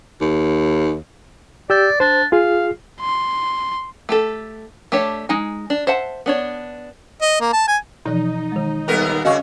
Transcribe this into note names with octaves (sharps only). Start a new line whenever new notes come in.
D#2
G4 D5 E6 G6
D4 C5
F4 G#4 F5
C6
A3 G4 A4
A3 D4 G4 C#5
G#3 D#4 G#5
D4
C5 E5 F#5 A5
B3 D4 C#5
D#5
A#3
A5
G#5
B2 E3 F3 D#4
D#3 G#3
D#2 G3 B3 A4 A#4
C#3 C#4 F#4 D#5 F5 C#6